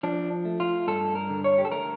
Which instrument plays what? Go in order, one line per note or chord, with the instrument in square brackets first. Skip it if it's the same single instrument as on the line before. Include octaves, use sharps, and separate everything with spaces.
[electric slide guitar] F3 D4
A3
F4
G2 A4
A#4
D3
C#5
G4
A4
A3 A#4